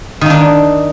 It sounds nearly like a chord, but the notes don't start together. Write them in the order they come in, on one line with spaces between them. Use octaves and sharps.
D#3 D#4 D4